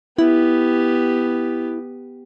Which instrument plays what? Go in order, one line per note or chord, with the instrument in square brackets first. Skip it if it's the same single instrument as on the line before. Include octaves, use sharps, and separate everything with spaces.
[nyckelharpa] B3 G4 [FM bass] E4